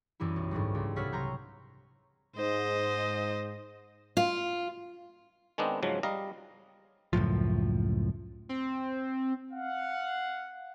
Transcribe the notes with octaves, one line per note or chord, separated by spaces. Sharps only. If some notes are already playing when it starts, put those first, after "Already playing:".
F#2 E3 G3 E4
B1
D2 G#2 F#3 G3
C#2
C2 A4 C#5 F#5 F6 B6
C3 F#3 A#5 C6 C#6 G6
G#2 C5 D#5
F4
D#3 G#3 B3 C4 D4 D#5
G#2 C#3 F3 F#3
G3 D#5 F5 A#5
C#2 F#2 A2 F3
C4
F5 F#5